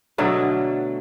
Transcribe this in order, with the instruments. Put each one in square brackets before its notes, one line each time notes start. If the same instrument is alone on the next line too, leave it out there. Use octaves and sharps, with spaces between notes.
[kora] B2 D3 F#3 A3